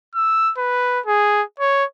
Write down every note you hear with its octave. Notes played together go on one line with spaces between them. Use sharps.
E6
B4
G#4
C#5